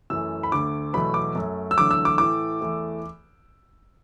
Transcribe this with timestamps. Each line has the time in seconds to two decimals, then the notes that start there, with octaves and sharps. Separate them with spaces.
0.10 F#2 E3 A3 E6
0.43 B5
0.52 D2 D3 A3 D6
0.93 E2 B2 F#3 A3 B5
1.14 D6
1.35 F#2 F#3 A3
1.71 E6
1.77 E2 D3 F#3 A3 D6
1.91 E6
2.05 D6
2.18 A2 E3 A3 D6
2.61 E2 E3 A3